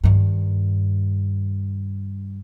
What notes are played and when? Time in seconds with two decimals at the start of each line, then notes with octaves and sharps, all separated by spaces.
0.04 G2 D#3